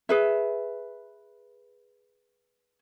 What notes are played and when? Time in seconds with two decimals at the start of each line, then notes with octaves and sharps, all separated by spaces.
0.09 G#4 B4 E5